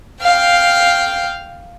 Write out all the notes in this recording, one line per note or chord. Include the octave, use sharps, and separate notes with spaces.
F5 G5